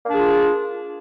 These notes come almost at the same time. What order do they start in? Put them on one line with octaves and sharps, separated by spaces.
A#3 D4 G#4 F4